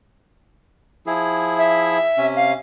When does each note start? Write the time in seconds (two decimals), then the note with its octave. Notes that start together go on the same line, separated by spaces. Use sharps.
1.06 F3 E4 G#4
1.58 E5
2.18 C3 C#4
2.36 F5